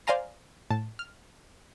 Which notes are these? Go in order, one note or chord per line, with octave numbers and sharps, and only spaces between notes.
C5 D5 F5 G#5 A#5 C6
A2 A5
F6